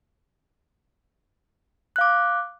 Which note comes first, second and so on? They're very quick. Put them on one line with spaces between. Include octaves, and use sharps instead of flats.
F#6 F5 D6